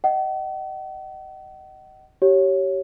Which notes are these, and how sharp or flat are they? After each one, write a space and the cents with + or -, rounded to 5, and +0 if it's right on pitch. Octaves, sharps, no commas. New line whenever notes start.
D#5 +0 F#5 +45
G4 -25 C#5 +0